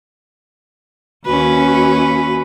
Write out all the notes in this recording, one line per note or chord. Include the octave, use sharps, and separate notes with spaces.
D#2 C#4 F#4 B4